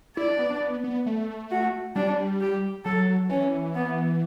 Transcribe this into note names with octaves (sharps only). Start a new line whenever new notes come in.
E4 D5
D4
B3
D4
B3
B3
A3
F#4
G3 D4
G4
F#3 A4
E3 C#4
B3